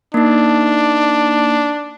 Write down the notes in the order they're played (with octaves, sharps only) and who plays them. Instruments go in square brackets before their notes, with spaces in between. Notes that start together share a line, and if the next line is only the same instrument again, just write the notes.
[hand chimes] A#3 D#4 [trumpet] D4